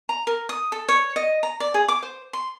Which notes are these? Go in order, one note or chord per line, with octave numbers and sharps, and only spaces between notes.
A#5
A#4
D#6
A4
C#5
D#5
A#5
D5
G#4
D6
C5
C6